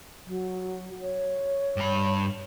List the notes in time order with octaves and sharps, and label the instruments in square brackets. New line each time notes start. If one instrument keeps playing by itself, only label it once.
[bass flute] F#3
C#5
[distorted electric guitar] G2 B5